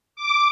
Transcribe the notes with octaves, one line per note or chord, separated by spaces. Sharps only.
D6